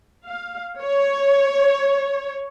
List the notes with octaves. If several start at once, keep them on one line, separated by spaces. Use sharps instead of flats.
F5
C#5